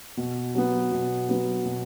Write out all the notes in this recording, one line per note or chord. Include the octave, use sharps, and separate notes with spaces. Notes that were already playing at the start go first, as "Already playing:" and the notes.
B2
F#3 B3
B2
F#3 B3
B2